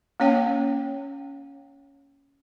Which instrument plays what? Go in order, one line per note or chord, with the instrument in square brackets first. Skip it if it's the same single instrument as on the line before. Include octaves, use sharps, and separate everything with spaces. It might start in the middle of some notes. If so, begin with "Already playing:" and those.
[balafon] A#3 C#4 C#5 G5